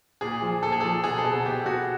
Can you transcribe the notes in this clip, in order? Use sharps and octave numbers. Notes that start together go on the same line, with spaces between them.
A#2 G#4
F3
A#2 A4
G#4
F3 A4
B2 G#4
A4
B2
A4
B2 G4
B2 F#4